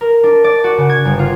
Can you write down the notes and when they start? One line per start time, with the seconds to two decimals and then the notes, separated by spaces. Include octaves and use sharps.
0.01 A#4
0.23 D4
0.44 D5
0.64 F#4
0.78 C#3
0.90 G#6
1.05 G1
1.19 F4